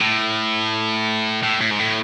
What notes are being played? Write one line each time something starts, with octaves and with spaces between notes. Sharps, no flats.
A2
A2
A2
G#2
A2